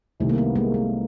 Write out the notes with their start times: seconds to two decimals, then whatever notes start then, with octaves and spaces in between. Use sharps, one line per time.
0.20 C2 C3 D#3 A3
0.29 A#3
0.38 A3 B3
0.56 G#3 A#3
0.74 A3